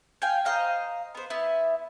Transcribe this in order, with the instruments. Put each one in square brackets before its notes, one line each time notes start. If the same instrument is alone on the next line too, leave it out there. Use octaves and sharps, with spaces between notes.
[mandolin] F5 G5 G#5
C5 D#5 F5 A#5
B3 C5
B3 E4